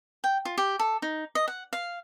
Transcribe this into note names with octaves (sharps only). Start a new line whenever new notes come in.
G5
F4
G4
A4
D#4
D#5
F#5
F5